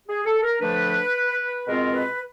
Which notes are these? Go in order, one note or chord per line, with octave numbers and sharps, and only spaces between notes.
G#4
A4
A#4
D3 F3 A3 D4 B4
B2 G#3 C4 F4 A#4
B4